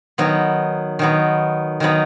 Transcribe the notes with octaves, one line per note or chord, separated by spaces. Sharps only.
D#3 F#3 B3
D#3 F#3 B3
D#3 F#3 B3